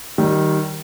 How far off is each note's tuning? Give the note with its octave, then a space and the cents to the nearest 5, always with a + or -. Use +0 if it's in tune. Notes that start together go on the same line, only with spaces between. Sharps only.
D#3 +0 G3 -25